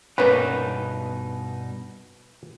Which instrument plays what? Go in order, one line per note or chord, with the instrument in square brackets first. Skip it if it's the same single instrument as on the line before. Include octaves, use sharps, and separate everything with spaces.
[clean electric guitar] G2 B2 D#4 [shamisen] A#3 B3 C#4 [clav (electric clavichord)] B4